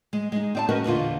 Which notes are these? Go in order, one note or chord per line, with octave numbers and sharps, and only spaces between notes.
G#3
G#3 D#4
C4 D5 A5
C#4 F#4 A#4 B4 D#5
E2 A#2 D3 F4